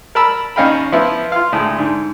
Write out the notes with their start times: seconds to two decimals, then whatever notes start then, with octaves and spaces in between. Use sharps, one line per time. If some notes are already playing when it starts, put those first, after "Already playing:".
0.15 A#4 A5 B5 E6
0.56 D#2 C#4 D#5 F5 G5 B5
0.92 F3 B3 E4
1.32 F4 F5
1.52 D2 A2 G#3
1.78 G#2 D3